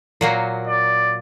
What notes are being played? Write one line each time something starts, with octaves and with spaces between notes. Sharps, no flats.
A#2 F#3 A#3
D5